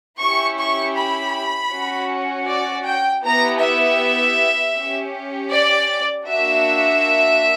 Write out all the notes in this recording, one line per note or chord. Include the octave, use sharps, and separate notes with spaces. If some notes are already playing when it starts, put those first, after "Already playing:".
C#4 E4 G4 C#6
C#6
B5
C#4 F#4
D5
G5
B3 E4 G4 A#5
E5
C#4 G4
D5
A#3 D4 F#4 E5